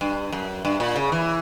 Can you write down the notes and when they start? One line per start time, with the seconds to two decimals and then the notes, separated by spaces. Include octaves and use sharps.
0.01 G2
0.32 F#2
0.65 G2
0.80 A#2
0.96 C#3
1.12 E3